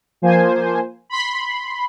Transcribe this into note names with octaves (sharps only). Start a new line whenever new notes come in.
F3 A#3 C5 G#5
B5 C6